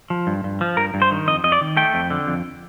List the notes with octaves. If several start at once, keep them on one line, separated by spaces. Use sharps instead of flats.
F3
G2
G2
F3
G2 A#4
G2
C5
D#3
F2 D#5
F2 D#5
D5
D#3
A3 G5
F2
D3
F2